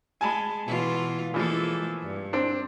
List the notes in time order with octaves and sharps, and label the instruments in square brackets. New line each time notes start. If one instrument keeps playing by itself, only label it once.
[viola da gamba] G#3 [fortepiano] G#5 A5 B5
[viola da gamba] B2 E3 F4
[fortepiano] E3 F3 [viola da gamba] G#3 A#3 A4
[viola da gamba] G2
[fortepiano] C4 D4